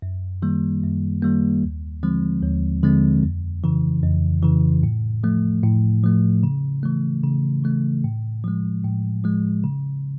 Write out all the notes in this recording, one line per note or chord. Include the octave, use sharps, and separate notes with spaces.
F#2
D#3 G3 A#3
F#2
D#3 G3 A#3
D#2
D3 F3 G#3 C4
D#2
D3 F3 G#3 C4
F2
C#3 E3
F2
C#3 E3
A2
F3 A3
A2
F3 A3
C#3
E3 A3
C#3
E3 A3
A2
F3 G#3
A2
F3 G#3
C#3